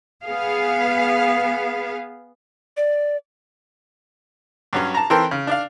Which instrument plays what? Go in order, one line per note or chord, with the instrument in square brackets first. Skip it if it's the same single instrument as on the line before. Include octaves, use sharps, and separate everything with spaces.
[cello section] B3 G#4 F5
[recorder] D5
[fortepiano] G2 F#3 C#4
A5 A#5
E3 C4 A4 A#4 G5 C6
C#3
D4 D5 F5